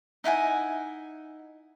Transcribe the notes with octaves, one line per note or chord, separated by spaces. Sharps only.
D#4 E4 F#5 G#5